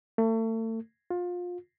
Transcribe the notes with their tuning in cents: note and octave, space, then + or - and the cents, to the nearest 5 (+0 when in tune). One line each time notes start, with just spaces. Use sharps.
A3 +35
F4 +25